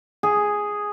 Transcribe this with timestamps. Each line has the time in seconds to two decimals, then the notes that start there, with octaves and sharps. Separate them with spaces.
0.23 G#4